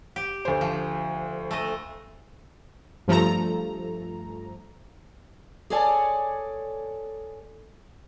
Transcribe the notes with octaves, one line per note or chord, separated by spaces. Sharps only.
G4
D2 C5
F3
A3 D#5
G2 F3 A3 A4 A#5
G#4 A4 C#5 D5 G#5 A5